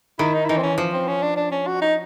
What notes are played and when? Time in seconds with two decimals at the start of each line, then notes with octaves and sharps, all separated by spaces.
0.19 D#3 E4
0.34 D#4
0.45 E4
0.49 E3 D#4
0.57 C4
0.63 C#4
0.78 F3
0.93 C4
1.08 C#4
1.22 D4
1.37 D4
1.51 C#4
1.67 F#4
1.82 D#4